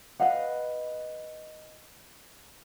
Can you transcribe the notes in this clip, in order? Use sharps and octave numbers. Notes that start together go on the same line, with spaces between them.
B4 D#5 F5 F#5